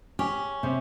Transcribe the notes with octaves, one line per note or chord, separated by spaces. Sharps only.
C#4 G4
C3